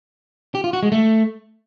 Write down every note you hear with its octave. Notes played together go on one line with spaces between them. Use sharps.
G4
F4
F#4
G#3
A3